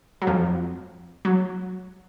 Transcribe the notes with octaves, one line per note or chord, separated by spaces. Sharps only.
F#3
F2 F3
F#3